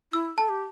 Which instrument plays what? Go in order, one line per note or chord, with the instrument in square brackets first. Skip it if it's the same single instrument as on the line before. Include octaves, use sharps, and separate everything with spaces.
[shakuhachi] E4 [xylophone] E6
[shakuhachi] A4 [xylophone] A5
[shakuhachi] G4